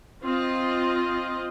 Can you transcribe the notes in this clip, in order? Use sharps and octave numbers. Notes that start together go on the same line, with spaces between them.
C4 F4 D#5